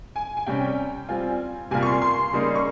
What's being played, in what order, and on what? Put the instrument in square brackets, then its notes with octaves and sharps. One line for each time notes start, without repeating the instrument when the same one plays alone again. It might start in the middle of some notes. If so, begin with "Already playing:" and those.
[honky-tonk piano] G#5
G#5
[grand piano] C3 G3 C#4 [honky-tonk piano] G5
[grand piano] G3 C4 F4 [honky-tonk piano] G#5
[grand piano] C3 G3 A#3 F4 A#4 [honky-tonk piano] G#5
[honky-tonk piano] C#6
C6
C6
[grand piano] C#3 G3 A#3 D#4 A#4
[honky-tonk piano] C#6